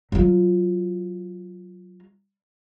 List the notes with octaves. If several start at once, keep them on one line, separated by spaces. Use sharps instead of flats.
F#3 F4